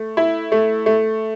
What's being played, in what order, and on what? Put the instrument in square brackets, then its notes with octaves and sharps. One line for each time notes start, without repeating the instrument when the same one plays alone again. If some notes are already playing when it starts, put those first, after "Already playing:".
Already playing: [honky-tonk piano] A3
E4
A3
A3